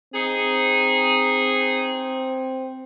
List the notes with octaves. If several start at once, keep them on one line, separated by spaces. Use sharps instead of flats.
C4 D#4 G#4